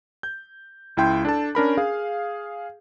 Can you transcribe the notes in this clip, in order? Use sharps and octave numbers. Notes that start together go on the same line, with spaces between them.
G6
C#2 E4 G5 C6 G6
D4 A4 A5
C#4 D4 A#4 B5
G#4 F5